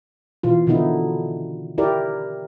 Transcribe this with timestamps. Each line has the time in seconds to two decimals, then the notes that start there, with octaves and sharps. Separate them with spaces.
0.43 B2 E3 F4
0.67 B2 D3 D#3 B3 D#4 E4
1.78 E4 G4 A#4 D5